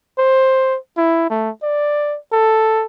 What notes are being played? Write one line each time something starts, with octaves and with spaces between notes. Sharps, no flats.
C5
E4
A3
D5
A4